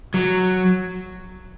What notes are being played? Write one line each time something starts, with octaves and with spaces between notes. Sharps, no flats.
F#3